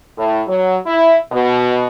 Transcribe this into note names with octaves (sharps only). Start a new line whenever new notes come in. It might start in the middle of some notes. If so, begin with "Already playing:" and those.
A2
F#3
E4
B2